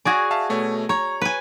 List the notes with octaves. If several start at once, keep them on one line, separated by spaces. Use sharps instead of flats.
F#4 G#4 D5 G#5 G#6 A#6
E5 F5 A5
B2 A3 C#5
C#5 A#5
B4 G#5